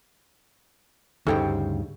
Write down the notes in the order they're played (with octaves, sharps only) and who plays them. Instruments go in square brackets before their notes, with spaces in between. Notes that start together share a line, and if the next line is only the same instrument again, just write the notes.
[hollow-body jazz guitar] D2 G2 C#3 [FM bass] D#4 [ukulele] A4 C5 G5